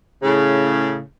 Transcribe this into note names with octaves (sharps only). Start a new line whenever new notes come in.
A2 C#3